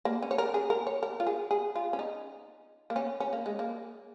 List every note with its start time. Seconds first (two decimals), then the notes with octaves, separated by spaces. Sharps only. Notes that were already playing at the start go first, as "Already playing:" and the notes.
0.05 A#3
0.22 C#4
0.31 C#5
0.38 A#4
0.54 G#4
0.70 A#4
0.87 C#5
1.03 A#4
1.20 F4
1.27 G#4
1.51 G#4
1.75 F4
1.93 C#4
1.99 D#4
2.90 A#3
2.96 C#4
3.20 C#4
3.33 A#3
3.46 G#3
3.59 A#3